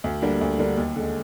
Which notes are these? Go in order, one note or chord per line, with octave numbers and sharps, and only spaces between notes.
D2
D3 G3 A#3 D4
D2
D3 G3 A#3 D4
D#2
D3 G#3